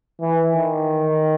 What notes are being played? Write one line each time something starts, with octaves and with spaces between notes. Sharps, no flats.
E3
D#3